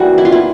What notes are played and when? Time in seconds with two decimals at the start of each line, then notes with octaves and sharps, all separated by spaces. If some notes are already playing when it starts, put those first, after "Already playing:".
Already playing: E3 G3 A#3 F#4
0.18 E4
0.25 F4
0.32 E4